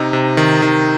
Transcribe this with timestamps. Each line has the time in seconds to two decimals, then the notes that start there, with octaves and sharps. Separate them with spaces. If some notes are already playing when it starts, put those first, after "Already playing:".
Already playing: C3 D#4
0.13 C3
0.37 D#3
0.62 D#3